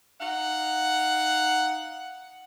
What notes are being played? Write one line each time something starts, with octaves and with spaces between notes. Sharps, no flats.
D#4 F5 F#5